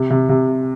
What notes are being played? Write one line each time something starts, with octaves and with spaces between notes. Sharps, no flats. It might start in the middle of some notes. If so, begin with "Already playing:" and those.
Already playing: C3
C3
C3